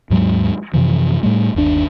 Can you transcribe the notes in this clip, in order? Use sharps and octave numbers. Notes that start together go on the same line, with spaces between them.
D#2 G#2 F#3 G#3
F#2 C3 E3 F3
A2 G3 A3
G1 D#2 D4